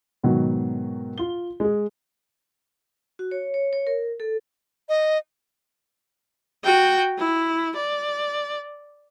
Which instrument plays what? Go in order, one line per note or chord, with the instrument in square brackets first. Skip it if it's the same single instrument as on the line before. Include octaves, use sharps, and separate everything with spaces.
[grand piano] G#2 B2 D#3 F#3
F4 G7
G#3 G#4
[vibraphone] F#4
C#5
C#5
C#5
A#4
A4
[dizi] D#5
[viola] F#4 G5
E4
D5